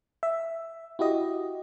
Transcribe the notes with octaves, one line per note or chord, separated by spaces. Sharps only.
E5
E4 F#4 G4 D#5